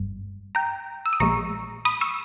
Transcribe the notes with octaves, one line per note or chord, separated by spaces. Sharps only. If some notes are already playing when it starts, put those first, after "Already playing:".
Already playing: G1 G2
G5 A#5
E6
D#6
A#1 A#2 G#3 A#5 C#6
B5 D#6
C#6 E6